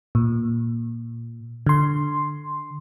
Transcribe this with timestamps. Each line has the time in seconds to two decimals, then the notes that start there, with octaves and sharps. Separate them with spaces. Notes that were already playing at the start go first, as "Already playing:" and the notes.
0.15 A#2
1.67 D3 C6